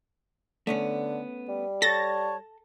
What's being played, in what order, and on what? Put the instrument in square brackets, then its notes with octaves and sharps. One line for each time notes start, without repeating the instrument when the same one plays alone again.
[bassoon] D3 [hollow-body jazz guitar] A3 B3 C#4
[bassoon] G3
[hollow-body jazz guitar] A4 [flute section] C#5 A5 C#6 [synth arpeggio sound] A6 A#6